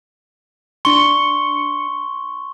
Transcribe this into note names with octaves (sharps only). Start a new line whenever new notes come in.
D4 C6 C#6 C#7 G7